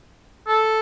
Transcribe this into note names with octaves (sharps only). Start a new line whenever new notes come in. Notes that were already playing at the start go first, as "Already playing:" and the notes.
A4